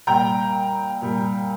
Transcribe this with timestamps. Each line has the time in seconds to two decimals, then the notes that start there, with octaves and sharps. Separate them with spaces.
0.07 A#2 G3 G5 A#5
1.02 A#2 G3